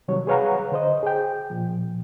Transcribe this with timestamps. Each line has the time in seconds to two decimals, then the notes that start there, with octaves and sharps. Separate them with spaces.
0.08 C3 D#3 F#3 G3 C#5
0.27 G#4 B4 C#5 F5 F#5 A#5
0.72 D3 C5 D#5
1.03 G#4 G5
1.50 A#2 F3